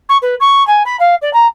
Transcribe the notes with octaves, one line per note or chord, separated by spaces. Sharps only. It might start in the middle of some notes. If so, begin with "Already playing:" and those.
C#6
B4
C#6
G#5
B5
F5
D5
A#5